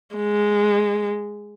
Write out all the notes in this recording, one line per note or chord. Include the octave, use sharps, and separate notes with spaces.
G#3